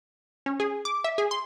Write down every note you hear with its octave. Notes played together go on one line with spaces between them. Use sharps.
C#4
G#4
D6
E5
G#4
C6